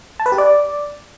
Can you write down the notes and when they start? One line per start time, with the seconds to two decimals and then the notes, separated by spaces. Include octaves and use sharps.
0.20 A5
0.26 B4
0.32 G4
0.38 D5